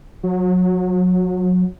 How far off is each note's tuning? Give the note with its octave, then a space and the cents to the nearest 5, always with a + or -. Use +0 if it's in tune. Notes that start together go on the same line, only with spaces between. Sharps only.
F#3 -25